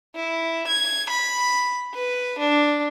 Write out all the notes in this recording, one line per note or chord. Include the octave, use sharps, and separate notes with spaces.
E4
G#6
B5
B4
D4